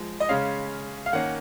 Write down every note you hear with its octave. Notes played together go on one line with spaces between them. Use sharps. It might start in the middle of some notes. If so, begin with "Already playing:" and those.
Already playing: F3 G#3
D#5
C#3 G#3 C#4 F5
F5
D#3 A#3 C#4 F#5